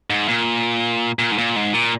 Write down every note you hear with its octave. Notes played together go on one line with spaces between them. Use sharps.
G#2
A#2
A#2
G#2
A#2
G#2
A#2